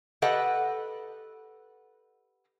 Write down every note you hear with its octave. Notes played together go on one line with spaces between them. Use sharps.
G4 A4 B4 D#5 F#5